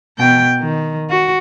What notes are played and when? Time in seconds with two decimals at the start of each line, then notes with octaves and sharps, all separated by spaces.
0.18 B2 G5
0.60 D#3
1.10 F#4